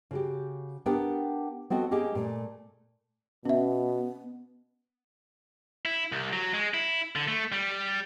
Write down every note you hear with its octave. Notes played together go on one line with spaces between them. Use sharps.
C#3 F#4 G4
B3 D4 G4 A#4 F#5 G5
B3 C4 F#4 A4 D#5
A#3 C#4 G4 G#4 D#5 G5
A#2 A3
B2 B3 C#4 E5
E4
C2
F#3
G#3
E4
D3
A3
G3